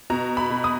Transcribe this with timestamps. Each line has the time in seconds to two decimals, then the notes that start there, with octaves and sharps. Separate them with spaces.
0.10 B2 A#5
0.37 B5
0.50 B2
0.64 D#6